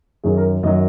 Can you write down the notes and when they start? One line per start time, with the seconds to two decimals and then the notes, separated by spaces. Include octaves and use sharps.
0.24 F#2 D#3 F#3 G#4
0.37 A#4
0.63 F#2 D#3 F#3 D#5